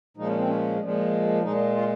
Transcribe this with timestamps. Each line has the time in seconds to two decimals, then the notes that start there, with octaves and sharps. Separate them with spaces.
0.17 A#2 F3 G#3 D#4
0.27 C#4
0.38 C4
0.47 C#4
0.80 A#2 F3 G#3
1.43 A#2 G#3 D#4
1.75 F4